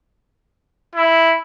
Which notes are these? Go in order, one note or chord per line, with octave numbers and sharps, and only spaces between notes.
E4